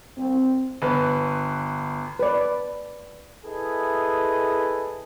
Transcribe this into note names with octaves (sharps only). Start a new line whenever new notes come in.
C4
G1 B4
B4 D5
E4 G#4 A4 B4 D#5